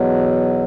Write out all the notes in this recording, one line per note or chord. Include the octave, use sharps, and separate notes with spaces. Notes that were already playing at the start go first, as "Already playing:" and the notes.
Already playing: E2 B2 F#3